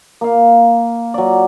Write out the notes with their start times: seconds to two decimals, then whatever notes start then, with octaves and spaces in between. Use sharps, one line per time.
0.21 A#3 F5
1.14 F#3 D5